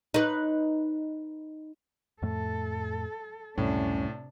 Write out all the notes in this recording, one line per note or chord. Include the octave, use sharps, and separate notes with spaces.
D#4 B4
F2 A2 A3 A4
C#2 F#2 A2 C3 G3 C#4 D4